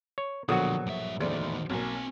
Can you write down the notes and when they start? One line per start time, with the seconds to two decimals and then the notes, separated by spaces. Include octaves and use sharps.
0.18 C#5
0.49 A#1 B2 D3 F3 F#3 F#4 A4 D#6
0.86 G2 E5
1.20 F#1 E2 D#3 A3 D5
1.70 B1 A#3 C4 G#5